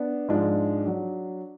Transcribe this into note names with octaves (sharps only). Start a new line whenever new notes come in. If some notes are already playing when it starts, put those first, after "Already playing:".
Already playing: B3 D4
G#2 F3 G#3 D4
F#3 D4